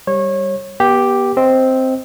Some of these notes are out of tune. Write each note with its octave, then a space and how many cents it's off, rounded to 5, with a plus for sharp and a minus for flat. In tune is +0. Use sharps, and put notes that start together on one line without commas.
G3 +0 C#5 -25
B3 -35 G4 +0 G5 +0
C4 +0 D#5 +15